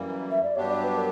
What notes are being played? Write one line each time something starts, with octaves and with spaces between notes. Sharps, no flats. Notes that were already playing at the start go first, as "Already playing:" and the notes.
Already playing: F#2 E3 G3 A#3
E5
D5
G2 F#3 B3 D4 G4 C#5
D5
B4
A#4